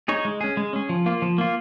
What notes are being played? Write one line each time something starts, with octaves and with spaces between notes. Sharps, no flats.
D#4 G#4 C#5
G#3
C#4 G#4
G#3
C#4 G#4
F3
A#3 F4
F3
A#3 F4